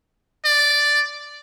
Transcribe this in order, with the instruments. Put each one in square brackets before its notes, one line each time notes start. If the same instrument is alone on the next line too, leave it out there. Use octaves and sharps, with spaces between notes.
[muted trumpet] D5